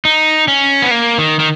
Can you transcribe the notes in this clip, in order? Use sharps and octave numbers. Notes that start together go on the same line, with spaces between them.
D#4
C#4
B3
A#3
D#3
D#3